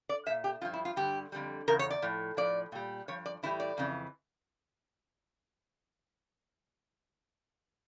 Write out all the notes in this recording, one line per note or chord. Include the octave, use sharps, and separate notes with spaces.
D5
F3 E5
A#2
G4
G2 F3 F4
E4
F4
G2 D3 G3 G4
F2 D3 G3
E2 C#3 A#4
C#5
D5
A2 F3
A2 F3 D5
A#2 G3
G2 F3 C#5
D5
A2 E3 G3 E4
D5
F2 C#3 E3